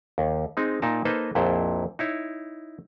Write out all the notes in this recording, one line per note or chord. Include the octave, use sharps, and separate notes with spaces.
D#2
G#3 C4 D#4
A#2 D#4 A#4 A5
A#3 D#4 A4 B4 C5 D#5
A#1 F2 A#2 E4 C5
D#4 E4 C#5